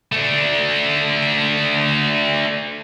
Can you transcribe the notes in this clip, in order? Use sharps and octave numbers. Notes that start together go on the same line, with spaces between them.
A3 D4